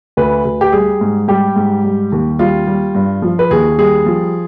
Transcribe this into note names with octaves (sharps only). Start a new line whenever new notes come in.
D2 B4
D2
G4
G3 G#4
G#2
G3 G4
G#2
G3
D#2
G3 F4
G3
G2
F3
B4
D#2 G#4
G3 G#4
F3